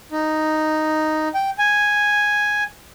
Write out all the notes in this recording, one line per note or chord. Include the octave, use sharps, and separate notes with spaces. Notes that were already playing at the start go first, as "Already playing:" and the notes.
D#4
G5
G#5